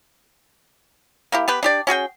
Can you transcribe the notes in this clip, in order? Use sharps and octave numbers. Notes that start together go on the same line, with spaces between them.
A#3 E4 G4
B3 G4 B4
D4 G4 D5
C#4 F#4 G#4 G5